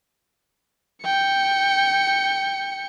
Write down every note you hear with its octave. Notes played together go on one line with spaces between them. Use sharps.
G5 C#7